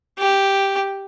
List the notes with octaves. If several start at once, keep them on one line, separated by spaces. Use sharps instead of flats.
G4